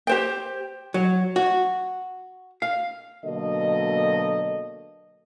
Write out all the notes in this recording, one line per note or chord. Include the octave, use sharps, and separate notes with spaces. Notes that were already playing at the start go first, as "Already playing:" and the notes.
G4 C5 G5
F#3
F#4
F5
B2 D3 F#3 A#3 A4 D#5